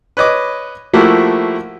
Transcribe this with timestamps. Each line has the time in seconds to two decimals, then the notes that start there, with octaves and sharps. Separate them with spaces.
0.17 B4 C#5 D#5 D6
0.93 F3 A3 A#3 E4 F#4 G4